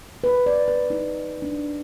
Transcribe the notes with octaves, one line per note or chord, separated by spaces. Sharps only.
B4
D5
B4
D#4
D4